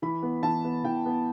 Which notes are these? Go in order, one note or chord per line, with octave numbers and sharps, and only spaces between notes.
E3 B5
B3
E3 A5
B3
E3 G5
B3